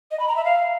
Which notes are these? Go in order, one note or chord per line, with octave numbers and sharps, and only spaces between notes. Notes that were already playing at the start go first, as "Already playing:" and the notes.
D#5
B5
A#5
E5
F5